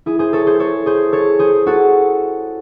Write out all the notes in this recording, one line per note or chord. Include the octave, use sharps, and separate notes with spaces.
E4 G#4
G#4 C5
A4 C#5
G#4 C5
A4 C#5
G#4 C5
A4 C#5
G#4 C5
F#4 A4